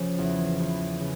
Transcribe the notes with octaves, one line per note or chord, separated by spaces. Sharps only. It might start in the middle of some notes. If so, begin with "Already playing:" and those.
Already playing: C#3 F3
E2
E2
C#3